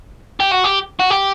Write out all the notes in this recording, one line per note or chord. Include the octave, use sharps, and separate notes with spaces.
G4
F#4
G4
F#4
G4